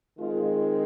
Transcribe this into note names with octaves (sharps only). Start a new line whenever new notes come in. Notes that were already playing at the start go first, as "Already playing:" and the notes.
D#3 G#3 C4 F4